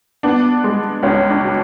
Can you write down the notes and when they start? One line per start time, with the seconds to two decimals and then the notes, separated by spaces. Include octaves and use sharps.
0.23 B3 D4
0.64 G#3
1.03 C#2 C#4
1.30 D4
1.43 B2